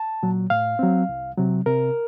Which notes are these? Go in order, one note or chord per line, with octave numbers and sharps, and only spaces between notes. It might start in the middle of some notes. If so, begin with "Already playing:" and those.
Already playing: A5
A#2 F#3
A2 F5
F#3 C4
C2
C3 F#3
C3 A#4